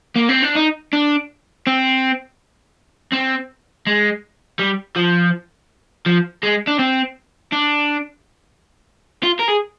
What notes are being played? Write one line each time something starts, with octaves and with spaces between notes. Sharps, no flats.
A#3
C4
D4
D#4
D4
C4
C4
G#3
G3
F3
F3
G#3
D4
C4
D4
F4
A#4
G#4